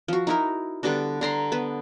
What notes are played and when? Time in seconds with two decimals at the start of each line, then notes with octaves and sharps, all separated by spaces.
0.08 F3 F#4
0.27 D#4 E4 A#4
0.83 D3 G3 B3 D4
1.21 D3 A#5 C6
1.52 B3 B4